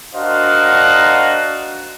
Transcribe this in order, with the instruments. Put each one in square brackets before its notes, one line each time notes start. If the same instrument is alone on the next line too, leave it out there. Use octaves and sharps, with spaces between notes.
[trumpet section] D4 F#4 A#4 C5 D#5 F5